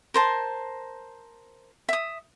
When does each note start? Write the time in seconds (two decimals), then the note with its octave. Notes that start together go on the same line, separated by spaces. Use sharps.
0.14 A#4 C5 A5
1.89 E5 D#6